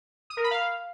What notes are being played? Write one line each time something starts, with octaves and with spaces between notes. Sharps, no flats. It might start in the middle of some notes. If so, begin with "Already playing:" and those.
D#6
A#4
B5
F5